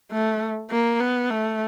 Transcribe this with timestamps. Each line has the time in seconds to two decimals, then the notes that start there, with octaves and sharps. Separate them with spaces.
0.11 A3
0.70 A#3
1.00 B3
1.30 A3